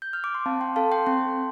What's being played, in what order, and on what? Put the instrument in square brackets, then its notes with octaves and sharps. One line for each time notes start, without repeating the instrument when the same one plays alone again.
[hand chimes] G6
F6
D6
C6
C4 F5 A5
G5 C6
A4 F5 A5
G5 C6
C4 G5 C6